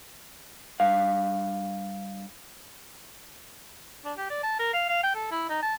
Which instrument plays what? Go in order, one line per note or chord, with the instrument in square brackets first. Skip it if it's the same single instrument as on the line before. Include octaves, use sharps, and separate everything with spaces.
[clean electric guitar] G2 F5
[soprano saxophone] D4
G4
D5
A5
A#4
F5
F5
G5
A4
E4
D#4
A5